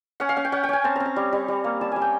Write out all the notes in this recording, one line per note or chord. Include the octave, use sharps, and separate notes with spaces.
C#4 F#5
F5
C#4 F#5
G5
C#4 F#5
G5
C#4 G#5
C4 A5
C4 A#5
A#5
G3
G3
G3
A#3
G3 A5
G3 G#5
G5